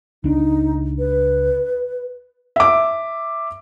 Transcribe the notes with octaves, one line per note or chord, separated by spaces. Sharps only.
C#2 D4 D#4
B4
E5 D6